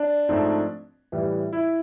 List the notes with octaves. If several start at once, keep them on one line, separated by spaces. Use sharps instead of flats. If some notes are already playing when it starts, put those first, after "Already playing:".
Already playing: D4
G#2 F3 A3 C4
A2 E3 G3
E4